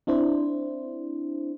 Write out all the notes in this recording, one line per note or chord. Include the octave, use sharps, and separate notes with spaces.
C4 D4 E4 C5